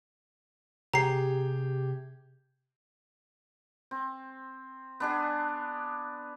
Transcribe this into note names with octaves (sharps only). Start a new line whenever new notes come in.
C3 G4 G#4 A#5 C7
C4
B3 D4 G#4